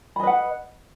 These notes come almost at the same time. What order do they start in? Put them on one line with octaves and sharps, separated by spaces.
B5 D#5 B4 F#5